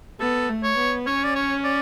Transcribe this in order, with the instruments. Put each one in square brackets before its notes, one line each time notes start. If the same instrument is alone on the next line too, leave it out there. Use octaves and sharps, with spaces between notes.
[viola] B3 [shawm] A4
[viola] A3
[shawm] C#5
[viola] B3
[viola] C#4 [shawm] C#5
[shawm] D5
C#5
D5